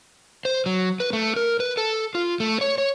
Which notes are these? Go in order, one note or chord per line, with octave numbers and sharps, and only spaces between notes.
C5
F#3
B4
A3
A#4
B4
A4
F4
A3
C#5
C#5